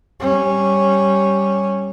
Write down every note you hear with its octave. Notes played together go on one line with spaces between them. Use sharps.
G3 C#4